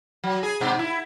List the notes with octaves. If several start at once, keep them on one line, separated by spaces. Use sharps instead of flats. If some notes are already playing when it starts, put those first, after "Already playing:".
F#3
G#4
G#2 B2
E4